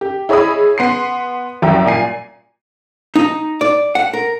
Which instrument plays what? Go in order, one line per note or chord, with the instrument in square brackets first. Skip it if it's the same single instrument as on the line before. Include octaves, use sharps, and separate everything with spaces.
[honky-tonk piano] G4
E4 G#4 C#5 D#5 B5 D#6
B3 C6 C7
C2 F#2 E5 G5
A#2 G#5 C7
[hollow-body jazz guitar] D#4
D5
F#5
A#4